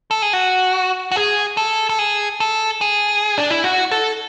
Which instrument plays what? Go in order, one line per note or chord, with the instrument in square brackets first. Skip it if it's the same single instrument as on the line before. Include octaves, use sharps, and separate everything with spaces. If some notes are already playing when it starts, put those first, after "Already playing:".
[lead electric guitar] A4
G#4
F#4
F#4
G#4
A4
A4
G#4
A4
G#4
D4
E4
F#4
A4